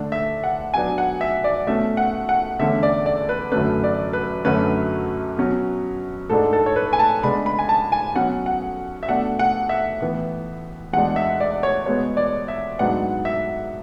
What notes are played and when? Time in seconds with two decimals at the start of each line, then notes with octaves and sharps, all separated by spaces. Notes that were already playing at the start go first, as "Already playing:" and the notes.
Already playing: D3 A3 D4
0.12 E5
0.44 F#5
0.74 B2 F#3 B3 D4 G#5
0.98 F#5
1.21 E5
1.44 D5
1.67 B2 A3 C#4 E5
1.97 F#5
2.29 F#5
2.59 E2 D3 A3 C#4 E5
2.83 D5
3.06 D5
3.29 B4
3.52 F#2 D3 F#3 A3 C#4 B4
3.84 D5
4.13 B4
4.45 F#2 D3 F#3 A3 C#4 B4
5.37 B2 F#3 C#4
6.30 G#2 G#3 D4 A4
6.53 A4
6.66 C#5
6.76 B4
6.93 G#5
6.99 A5
7.23 C#3 G#3 B3 D4 B5
7.46 B5
7.59 G#5
7.69 A5
7.92 G#5
8.15 B2 F#3 C#4 F#5
8.46 F#5
9.03 E5
9.08 B2 A3 D4 F#5
9.39 F#5
9.69 E5
10.00 A2 E3 B3
10.93 E2 B2 G#3 D4 F#5
11.16 E5
11.40 D5
11.63 C#5
11.86 B2 G#3 B3 C#5
12.17 D5
12.48 E5
12.79 G#2 F#3 B3 D4 F#5
13.25 E5